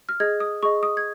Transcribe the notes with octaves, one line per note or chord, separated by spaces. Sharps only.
F6
G#4 D#5 G#6
D#6
G#4 D#5 C#6
D#6
G#6